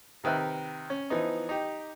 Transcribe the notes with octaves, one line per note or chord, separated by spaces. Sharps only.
C3 D#3 B4 E5 F#6
C#4
E3 F3 B3 D#4
D#4 G4